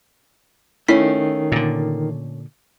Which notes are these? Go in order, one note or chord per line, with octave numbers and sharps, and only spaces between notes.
D#3 A3 C#4 E4 B6 C7
A#2 D3